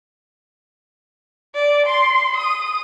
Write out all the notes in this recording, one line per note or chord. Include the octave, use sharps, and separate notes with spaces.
D5
C6
D#6